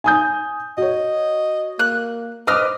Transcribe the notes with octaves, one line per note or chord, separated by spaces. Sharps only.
G#5 D#6 G6
F#4 C#5 D#5
A#3 F#6
B4 C5 D#5 D6 D#6 F6